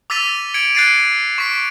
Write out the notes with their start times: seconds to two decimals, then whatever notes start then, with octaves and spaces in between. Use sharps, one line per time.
0.10 D6 E6 A6 B6 D#7 F7
0.54 G#6 C#7 D7 F#7
0.75 F#6 G#6 A6 C7 D7 D#7
1.38 C#6 B6 D7